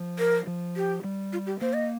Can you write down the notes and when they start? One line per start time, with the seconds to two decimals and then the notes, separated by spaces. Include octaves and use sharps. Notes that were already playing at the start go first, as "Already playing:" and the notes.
Already playing: F3
0.19 A#4
0.47 F3
0.76 G4
1.04 G3
1.33 F4
1.46 G4
1.61 A#3 C5
1.73 D#5